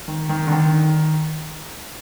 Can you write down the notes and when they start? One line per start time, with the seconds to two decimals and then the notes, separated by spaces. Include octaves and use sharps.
0.08 D#3
0.29 D#3
0.47 D3
0.52 D#3